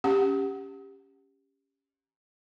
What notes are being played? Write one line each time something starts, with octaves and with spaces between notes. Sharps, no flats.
C#4 G4 F#5